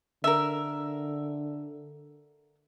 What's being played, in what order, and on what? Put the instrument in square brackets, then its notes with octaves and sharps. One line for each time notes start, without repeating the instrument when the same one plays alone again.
[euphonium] D3 [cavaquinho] A#4 E5